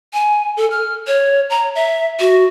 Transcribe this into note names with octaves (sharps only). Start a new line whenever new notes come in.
G#5
A4
F6
C#5
A#5
E5
F#4